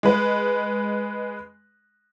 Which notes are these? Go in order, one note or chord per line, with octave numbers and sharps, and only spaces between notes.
G#3 B4